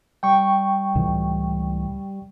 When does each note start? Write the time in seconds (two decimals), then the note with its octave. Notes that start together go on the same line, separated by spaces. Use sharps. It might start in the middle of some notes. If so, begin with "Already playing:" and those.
0.23 G3 G5 C#6
0.95 C#2 A2 E3